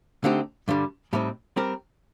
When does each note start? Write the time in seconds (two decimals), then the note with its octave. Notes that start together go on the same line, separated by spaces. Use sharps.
0.24 D3 A3 C4 D#4 G4
0.68 G2 D3 G3
1.13 A2 G3 C4 D#4
1.56 G3 C4 G4 A#4